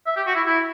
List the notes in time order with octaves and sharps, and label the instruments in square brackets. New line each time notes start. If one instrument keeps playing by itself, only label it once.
[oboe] E5
G4
F#4
E4
E4